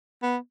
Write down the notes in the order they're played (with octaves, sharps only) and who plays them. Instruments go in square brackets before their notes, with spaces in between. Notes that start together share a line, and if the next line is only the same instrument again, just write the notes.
[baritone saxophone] B3